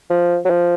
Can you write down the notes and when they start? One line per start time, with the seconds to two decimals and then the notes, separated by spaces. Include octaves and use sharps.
0.10 F3
0.45 F#3
0.50 F3